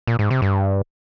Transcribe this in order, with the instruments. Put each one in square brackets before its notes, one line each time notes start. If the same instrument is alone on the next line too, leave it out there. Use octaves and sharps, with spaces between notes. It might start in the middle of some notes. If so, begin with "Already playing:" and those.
[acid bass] A#2
G#2
C3
G2